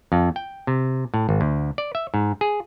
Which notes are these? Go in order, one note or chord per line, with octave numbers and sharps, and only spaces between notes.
F2
G5
C3
A2
G#1
D2
D5
E5
G#2
G#4